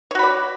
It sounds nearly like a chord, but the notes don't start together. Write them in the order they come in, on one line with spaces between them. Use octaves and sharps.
C#5 F#4 B5 D5